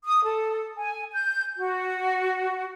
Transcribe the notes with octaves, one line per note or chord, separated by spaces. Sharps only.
D#6
A4
G#5
G6
F#4